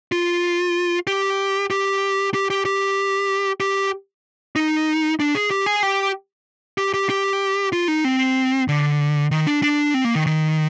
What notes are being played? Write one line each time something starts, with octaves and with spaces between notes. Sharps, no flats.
F4
G4
G4
G4
G4
G4
G4
D#4
D4
G#4
G4
G#4
G4
G4
G4
G4
F4
D#4
C4
D3
D#3
D4
D4
C4
A#3
D#3
D#3